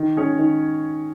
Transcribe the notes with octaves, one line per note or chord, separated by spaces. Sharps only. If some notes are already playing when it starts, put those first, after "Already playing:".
Already playing: D#3
G#3 C#4 G#4 C#5
D#3